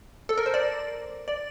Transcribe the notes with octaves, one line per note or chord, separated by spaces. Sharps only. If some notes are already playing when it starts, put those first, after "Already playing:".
A4
A#4
C5
D5
D5